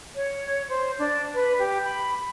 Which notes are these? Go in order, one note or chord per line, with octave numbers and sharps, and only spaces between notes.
C#5
C5
D4
B4
G4
B5